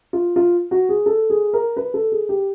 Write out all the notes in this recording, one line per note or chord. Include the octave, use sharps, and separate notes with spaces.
F4
F4
F#4
G#4
A4
G#4
A#4
B4
A4
G#4
G4